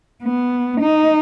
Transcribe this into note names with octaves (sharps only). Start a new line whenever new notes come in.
B3
D#4